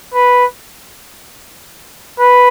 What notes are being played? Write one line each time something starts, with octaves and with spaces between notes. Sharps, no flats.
B4
B4